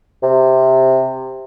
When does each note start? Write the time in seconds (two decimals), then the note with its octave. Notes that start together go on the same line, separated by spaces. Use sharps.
0.23 C3